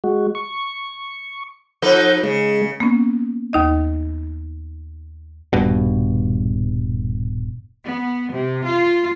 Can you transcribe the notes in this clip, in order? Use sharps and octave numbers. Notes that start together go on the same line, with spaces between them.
G#3 F#4
C#6
F3 D#4 A4 B4 F#5 G6
C#3 G#3
A#3 B3 C#4
D#2 D#4 D#5
D#1 G2 B2
B3
C3
F4